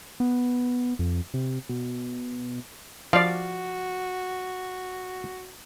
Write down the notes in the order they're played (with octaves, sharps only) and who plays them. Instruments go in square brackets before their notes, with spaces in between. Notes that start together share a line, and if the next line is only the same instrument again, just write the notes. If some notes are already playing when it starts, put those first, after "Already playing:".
[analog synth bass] B3
F2
C3
B2
[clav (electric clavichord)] F3 [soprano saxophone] F#4 [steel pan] D5 F5